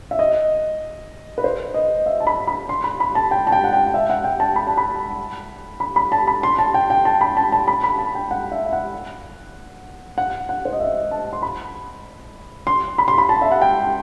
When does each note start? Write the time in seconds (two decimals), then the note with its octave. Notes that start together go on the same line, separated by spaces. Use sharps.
0.11 E5
0.19 D#5
1.38 B4
1.44 C5
1.74 D#5
2.06 E5
2.20 A5
2.27 B5
2.47 B5
2.69 C6
2.84 B5
3.00 B5
3.15 A5
3.31 G5
3.47 A5
3.52 G5
3.64 F#5
3.73 G5
3.94 E5
4.10 F#5
4.24 G5
4.40 A5
4.56 B5
4.67 A5
4.77 B5
5.80 B5
5.96 B5
6.12 A5
6.27 B5
6.43 C6
6.59 A5
6.74 G5
6.90 G5
7.05 A5
7.21 B5
7.37 A5
7.52 A5
7.68 B5
7.84 B5
7.99 A5
8.15 G5
8.31 F#5
8.52 E5
8.66 E5
8.73 F#5
10.18 F#5
10.49 F#5
10.65 C5
10.73 D#5
10.80 E5
11.11 A5
11.33 C6
11.42 B5
12.67 C6
12.98 B5
13.08 C6
13.18 B5
13.29 A5
13.42 E5
13.52 F#5
13.62 G5